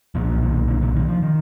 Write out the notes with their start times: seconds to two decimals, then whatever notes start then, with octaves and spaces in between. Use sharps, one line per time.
0.15 B1 A#2 F3
0.42 D#3
0.68 D3
0.81 D3
0.95 D#3
1.09 F3
1.23 D#3